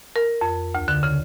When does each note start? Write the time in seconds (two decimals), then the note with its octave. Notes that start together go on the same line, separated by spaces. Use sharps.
0.16 A#4
0.41 F2
0.75 D2
0.88 D3
1.03 C#3